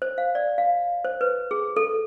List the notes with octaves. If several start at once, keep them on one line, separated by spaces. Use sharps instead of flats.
C5
F5
D5
F5
C5
B4
G#4
A4